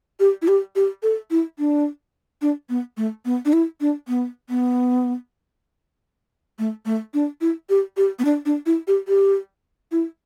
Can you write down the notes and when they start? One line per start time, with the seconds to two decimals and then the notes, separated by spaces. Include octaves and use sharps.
0.20 G4
0.42 E4
0.48 G4
0.76 G4
1.03 A4
1.31 E4
1.59 D4
2.42 D4
2.69 B3
2.97 A3
3.25 B3
3.45 D4
3.53 E4
3.81 D4
4.08 B3
4.50 B3
6.59 A3
6.85 A3
7.14 D4
7.41 E4
7.70 G4
7.97 G4
8.19 B3
8.25 D4
8.46 D4
8.66 E4
8.88 G4
9.08 G4
9.92 E4